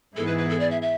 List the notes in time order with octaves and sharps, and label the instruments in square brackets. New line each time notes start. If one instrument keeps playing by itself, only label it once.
[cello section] G#2 E3 B3 E4 G#4 [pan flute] A4
[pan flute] B4
B4
A4
D5
E5
E5